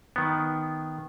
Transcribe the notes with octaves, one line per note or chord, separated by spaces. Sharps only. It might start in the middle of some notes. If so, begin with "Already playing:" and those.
D#3 B3